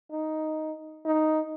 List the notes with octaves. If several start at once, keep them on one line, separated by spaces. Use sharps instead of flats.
D#4
D#4